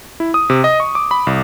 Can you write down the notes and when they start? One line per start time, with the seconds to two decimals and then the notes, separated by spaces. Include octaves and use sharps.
0.20 E4
0.34 D#6
0.50 C3
0.64 D#5
0.80 C#6
0.95 D6
1.11 B5
1.27 C2